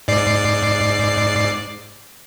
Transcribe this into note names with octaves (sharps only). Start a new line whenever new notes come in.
G#2 D5 C7